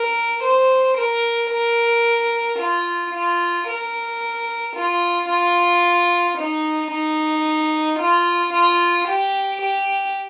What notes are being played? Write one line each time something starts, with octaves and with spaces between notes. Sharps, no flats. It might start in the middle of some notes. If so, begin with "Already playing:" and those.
Already playing: A#4
C5
A#4
A#4
F4
F4
A#4
F4
F4
D#4
D#4
F4
F4
G4
G4